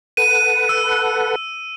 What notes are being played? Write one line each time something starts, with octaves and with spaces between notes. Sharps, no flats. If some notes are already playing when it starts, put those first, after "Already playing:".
A4 B4 F#5 D#7
E6